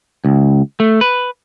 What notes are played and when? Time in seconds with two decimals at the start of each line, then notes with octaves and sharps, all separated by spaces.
0.25 C#2
0.80 A3
1.01 B4